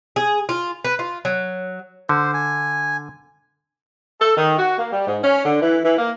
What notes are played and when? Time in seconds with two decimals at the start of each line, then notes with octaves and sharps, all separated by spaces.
0.16 G#4
0.49 F4
0.85 B4
0.99 F4
1.25 F#3
2.09 D3 C5
2.34 G#5
4.21 A4
4.37 D#3
4.59 F#4
4.78 A#3
4.92 G3
5.07 G#2
5.24 C#4
5.45 D3
5.62 E3
5.84 E3
5.98 A#3